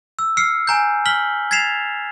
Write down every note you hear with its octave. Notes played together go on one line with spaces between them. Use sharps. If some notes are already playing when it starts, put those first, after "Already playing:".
E6
E6 F6 C7 C#7
G#5 A#5 G6
F6 B6 F#7 G7
G#6 A6 B6 C7 E7 F7